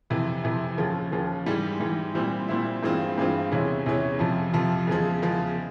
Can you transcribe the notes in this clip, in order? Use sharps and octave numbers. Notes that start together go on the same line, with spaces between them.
F2 C3 E3
F2 C3 E3
D#2 C#3 F3
D#2 C#3 F3
G#2 E3 G3
G#2 E3 G3
A#2 G3 C4 E4
A#2 G3 C4 E4
G2 E3 G#3 C4 F4
G2 E3 G#3 C4 F4
E2 C3 E3 G#3 C#4
E2 C3 E3 G#3 C#4
F2 C3 F3
F2 C3 F3
E2 C#3 F3 G#3
E2 C#3 F3 G#3